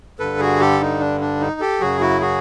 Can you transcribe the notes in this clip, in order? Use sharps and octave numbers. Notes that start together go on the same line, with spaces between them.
G2 D3 G3 A4 B4
F#4 G#4
G4 A4
D#4
D4
D4
D#4
G4 A4
F#2 C#3 F#3 F#4 G#4
E4 F#4
F#4 G#4